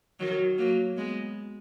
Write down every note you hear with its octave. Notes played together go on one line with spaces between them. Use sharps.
D#3 F#3
F#3 A#3
G#3 B3